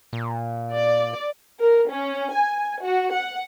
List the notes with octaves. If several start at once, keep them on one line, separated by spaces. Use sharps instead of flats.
A#2
D5
A#4
C#4
G#5
F#4
F#5